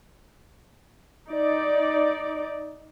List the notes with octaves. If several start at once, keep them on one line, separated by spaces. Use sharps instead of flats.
D#4 D5